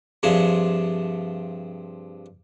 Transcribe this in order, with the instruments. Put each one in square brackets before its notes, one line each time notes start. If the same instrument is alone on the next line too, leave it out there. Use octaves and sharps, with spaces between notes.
[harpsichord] G2 C3 F3 G#4